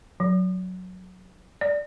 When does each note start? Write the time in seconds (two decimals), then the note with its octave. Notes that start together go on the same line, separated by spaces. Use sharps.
0.20 F#3
1.61 D5